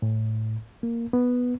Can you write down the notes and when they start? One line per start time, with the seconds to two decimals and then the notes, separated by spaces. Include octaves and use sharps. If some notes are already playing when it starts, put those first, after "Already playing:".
0.02 A2
0.83 A#3
1.13 B3